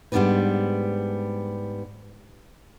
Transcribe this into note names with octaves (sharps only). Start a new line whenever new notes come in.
G#2 G3 B3 D4 D#4 B4